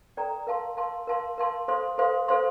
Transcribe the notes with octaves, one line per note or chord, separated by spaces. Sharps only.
A4 D5 G5 A#5
A#4 F5 A5 C6
A#4 F5 A5 C6
A#4 F5 A5 C6
A#4 F5 A5 C6
A4 C5 F5 C6
A4 C5 F5 C6
A4 C5 F5 C6